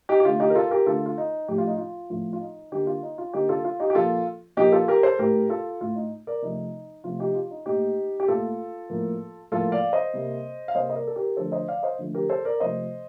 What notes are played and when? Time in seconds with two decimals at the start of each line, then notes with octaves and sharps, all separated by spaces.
0.09 D#4 G4
0.20 G4
0.25 D3 A3 F4
0.40 D#4 G4
0.50 A#4
0.55 F4 A4
0.71 G4 A#4
0.86 D3 A3 F4 A4
1.06 F4
1.18 D#4
1.48 A2 F3 A3 G4
1.58 F4
1.67 D#4
1.78 F4
2.10 A2 F3 A3 F4
2.33 F4
2.41 D#4
2.72 D3 G3 A#3 D#4 G4
2.87 F4
3.03 D#4
3.18 F4
3.33 D3 G3 A#3 D#4 G4
3.49 F4 A4
3.65 F4
3.80 D#4 G4
3.90 G4
3.95 A#2 F3 A#3 F4 A4
4.57 A#2 F3 A#3 D#4 G4
4.72 F4 A4
4.88 G4 A#4
5.03 A4 C5
5.19 A2 A3 G4 A#4
5.49 F4 A4
5.81 A2 A3 F4
5.96 D#4
6.27 A#4 D5
6.42 C3 F3 A3 D#4
7.04 C3 F3 A3 F4
7.19 D#4 G4
7.30 D#4
7.35 F4
7.51 D#4
7.66 A#2 A3 D#4 G4
8.20 G4
8.28 A#2 A3 F4 A4
8.90 A2 F3 A#3
9.51 A2 F3 A#3 F4 A4
9.72 D5 F5
9.93 C5 D#5
10.13 C3 G3 A#3
10.68 F5
10.75 C3 G3 A#3 C5 D#5
10.90 D#5
10.96 A#4 D5
11.07 A4
11.16 G4 A#4
11.37 D3 F3 A3 A4 C5
11.52 C5 D#5
11.68 D5 F5
11.83 C5 D#5
11.99 D3 F3 A3
12.14 G4 A#4
12.29 A4 C5
12.45 A#4 D5
12.60 C3 F3 A3 C5 D#5